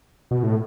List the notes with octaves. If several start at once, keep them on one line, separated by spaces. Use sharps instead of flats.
B2
A2